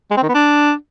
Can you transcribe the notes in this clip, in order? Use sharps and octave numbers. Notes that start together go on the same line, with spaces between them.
G#3
C4
D#3
B3
D4